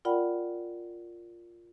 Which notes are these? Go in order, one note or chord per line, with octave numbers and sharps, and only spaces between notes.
F4 A#4 D5 F#5 G5 B5